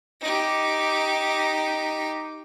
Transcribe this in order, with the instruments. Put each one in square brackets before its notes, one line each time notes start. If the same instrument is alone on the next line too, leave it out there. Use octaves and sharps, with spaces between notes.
[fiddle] D#4 G4